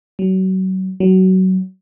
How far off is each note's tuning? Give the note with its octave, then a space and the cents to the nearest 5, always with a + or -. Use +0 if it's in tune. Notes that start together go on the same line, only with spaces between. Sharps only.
F#3 +30
F#3 +20